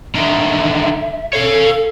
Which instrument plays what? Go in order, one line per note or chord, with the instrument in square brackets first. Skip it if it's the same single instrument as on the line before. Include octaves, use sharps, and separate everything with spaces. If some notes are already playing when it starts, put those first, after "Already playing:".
[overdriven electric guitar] D3 D#3 [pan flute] E5
[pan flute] A4 [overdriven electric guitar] C#5 F5